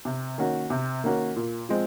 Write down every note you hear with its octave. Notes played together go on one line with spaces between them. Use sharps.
C3
D#3 A#3 C#4 F#4
C3
D#3 A#3 C#4 F#4
A#2
F3 G#3 C4